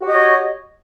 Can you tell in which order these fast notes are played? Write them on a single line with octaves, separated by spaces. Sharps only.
F#4 G4 D#5 C#5